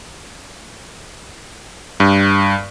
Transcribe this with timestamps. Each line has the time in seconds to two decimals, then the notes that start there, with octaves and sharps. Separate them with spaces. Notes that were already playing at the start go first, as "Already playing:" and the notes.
2.00 G2